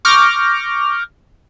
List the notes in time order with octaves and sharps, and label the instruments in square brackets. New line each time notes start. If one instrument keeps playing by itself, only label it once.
[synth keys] C#6 D6 F6 G6 A#6